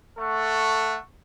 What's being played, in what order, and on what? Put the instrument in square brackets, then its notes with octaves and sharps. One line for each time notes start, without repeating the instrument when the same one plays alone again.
[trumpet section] A3 A4 F#5 C#6